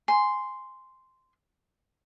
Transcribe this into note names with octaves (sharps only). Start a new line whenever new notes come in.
G#5 C6